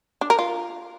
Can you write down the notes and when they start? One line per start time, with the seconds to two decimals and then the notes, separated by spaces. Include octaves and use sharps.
0.21 D4
0.30 A#4
0.39 F4